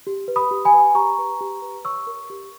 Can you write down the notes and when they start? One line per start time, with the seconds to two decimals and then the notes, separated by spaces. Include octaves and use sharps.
0.07 G4
0.28 B4
0.36 B5 D#6
0.51 G4
0.65 G#5 B5
0.73 B4
0.95 G4 A#5 C#6
1.18 B4
1.41 G4
1.62 B4
1.84 C#5 C#6 E6
2.07 A#4
2.30 G4